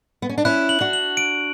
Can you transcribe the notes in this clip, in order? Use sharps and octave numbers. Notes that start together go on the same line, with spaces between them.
B3
C#4
D4
C#4 E4 F#6
F#7
D4 F#4
F#7
D7